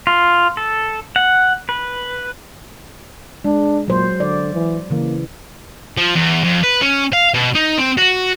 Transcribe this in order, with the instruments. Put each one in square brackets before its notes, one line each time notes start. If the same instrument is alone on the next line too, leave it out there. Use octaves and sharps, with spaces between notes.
[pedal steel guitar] F4
A4
F#5
B4
[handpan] G#3 [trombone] D4
[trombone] A#2 [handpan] F#3 C5
[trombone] D3 [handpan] D5
[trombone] E3
[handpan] C#3 E3 [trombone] A#3
[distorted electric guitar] F3
E2
F2
B4
C#4
F5
B2
D#4
C4
F#4